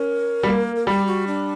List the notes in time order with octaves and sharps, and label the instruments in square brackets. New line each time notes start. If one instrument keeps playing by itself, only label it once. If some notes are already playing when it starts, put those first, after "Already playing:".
Already playing: [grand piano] C#4 [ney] A#4
[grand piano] G3
A#3
[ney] A#4
[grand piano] G3 [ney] G4
[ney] F#4
D4